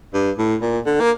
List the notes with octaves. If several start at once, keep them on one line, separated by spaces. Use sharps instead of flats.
G2
A2
A#2
D3
A#3